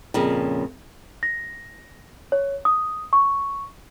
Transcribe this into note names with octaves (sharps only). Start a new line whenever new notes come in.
F2 A#2 C#3
A#6
C#5
D#6
C#6